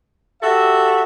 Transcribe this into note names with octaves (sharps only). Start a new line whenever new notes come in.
F#4 G4 A4 E5